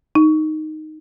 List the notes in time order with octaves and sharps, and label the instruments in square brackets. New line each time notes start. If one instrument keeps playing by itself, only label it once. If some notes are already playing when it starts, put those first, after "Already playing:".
[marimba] D#4